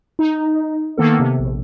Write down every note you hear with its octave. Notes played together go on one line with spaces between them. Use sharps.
D#4
D#3 A#3 B3 A4
C3
A#1